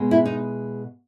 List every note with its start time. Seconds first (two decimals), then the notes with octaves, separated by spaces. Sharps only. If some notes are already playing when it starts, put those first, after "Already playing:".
Already playing: B2 G#3
0.11 E4
0.25 D#4